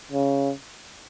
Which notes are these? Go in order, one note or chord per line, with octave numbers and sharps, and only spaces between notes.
C#3